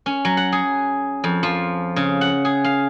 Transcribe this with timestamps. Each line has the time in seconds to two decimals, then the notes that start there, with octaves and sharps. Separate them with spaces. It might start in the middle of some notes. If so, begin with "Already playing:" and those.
0.06 C#4
0.25 F#3
0.37 F#5
0.52 G#4
1.24 F2
1.43 F3
1.96 C#3
2.21 F#5
2.45 G#4
2.64 F5